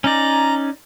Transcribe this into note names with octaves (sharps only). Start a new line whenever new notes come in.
C#4 D#4 D5 A#5